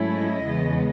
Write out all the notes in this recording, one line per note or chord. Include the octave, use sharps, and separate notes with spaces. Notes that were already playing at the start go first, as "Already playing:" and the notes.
Already playing: G#2 F#3 A3 C#4 E4
D#5
E2 C#3 G#3 B3